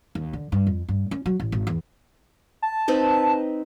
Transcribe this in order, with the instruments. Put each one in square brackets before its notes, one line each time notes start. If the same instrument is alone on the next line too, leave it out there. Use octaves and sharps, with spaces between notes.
[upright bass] D#2
D3
G2
F2
G2
C#4
F#3
A1
G#1
E2
[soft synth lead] A5
[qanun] C4 D#4 B4